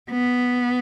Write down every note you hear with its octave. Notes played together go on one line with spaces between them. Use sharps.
B3